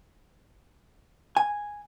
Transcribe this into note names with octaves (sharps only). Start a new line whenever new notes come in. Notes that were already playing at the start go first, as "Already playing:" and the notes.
G#5